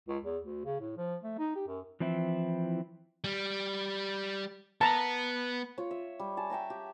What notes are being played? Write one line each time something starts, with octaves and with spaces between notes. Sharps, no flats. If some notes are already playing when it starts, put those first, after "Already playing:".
C#2
E2
D2
C#3
A2
F3
A3
D#4
G4
F#2
E3 F3 C4 E4
G3
B3 A5 A#5
F4 C#5
E5
G3
G#5 A5
E5 G5 A5 A#5
G4